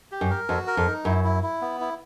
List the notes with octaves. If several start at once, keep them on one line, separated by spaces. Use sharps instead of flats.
G4
F#2
A#4
F2 F#4
A#4
F2
D#4
F#2 E4
E4
E4
B3
E4